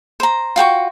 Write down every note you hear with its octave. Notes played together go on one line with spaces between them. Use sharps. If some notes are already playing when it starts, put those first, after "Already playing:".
C5 A#5
F4 F#4 G5 C#6